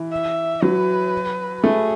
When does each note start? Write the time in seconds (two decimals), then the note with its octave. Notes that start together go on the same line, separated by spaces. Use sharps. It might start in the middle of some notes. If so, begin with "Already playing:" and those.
Already playing: E3
0.11 E5
0.62 F#3 B4
1.63 A3 G#4